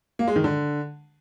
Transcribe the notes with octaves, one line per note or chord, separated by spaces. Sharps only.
A#3
G#3
D#3
D3